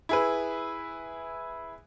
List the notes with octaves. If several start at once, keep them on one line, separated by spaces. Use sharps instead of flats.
E4 G#4 B4